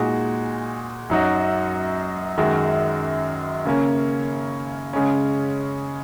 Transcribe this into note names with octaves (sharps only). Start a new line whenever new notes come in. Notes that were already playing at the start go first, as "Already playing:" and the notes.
Already playing: A#2 G#3 D#4 F#4
F#2 F#3 D#4 F#4
F#2 D#3 G#3 F#4
C#3 A#3 C#4
C#3 G#3 C#4